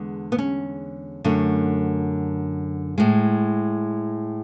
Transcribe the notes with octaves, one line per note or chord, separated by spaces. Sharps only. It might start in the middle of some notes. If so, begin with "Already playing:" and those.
Already playing: E2 D3 G#3
B3
C#4
F#2 D3 A3
A2 G#3